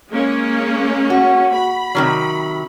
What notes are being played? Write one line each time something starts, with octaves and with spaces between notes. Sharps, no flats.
G#3 A#3 C#4
F#4
B5
C3 D#3 F#3